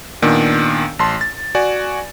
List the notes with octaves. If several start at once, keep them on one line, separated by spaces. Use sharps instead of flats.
A#2 D#3 B3 D4
A1 A5 C6
A6
F#4 D5 G#5